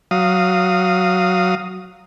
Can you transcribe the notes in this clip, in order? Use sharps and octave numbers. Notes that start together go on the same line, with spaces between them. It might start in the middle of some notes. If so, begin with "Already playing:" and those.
F#3 F5 D#6